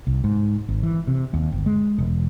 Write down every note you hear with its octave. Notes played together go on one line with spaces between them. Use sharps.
C2
G#2
G#1
E3
C3
D#2
G1
G#3
E1